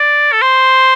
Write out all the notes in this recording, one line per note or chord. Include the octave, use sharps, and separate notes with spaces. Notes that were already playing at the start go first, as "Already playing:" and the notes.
Already playing: D5
A4
C5